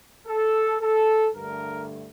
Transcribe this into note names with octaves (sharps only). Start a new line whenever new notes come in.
A4
A4
G2 D3 A3 A#4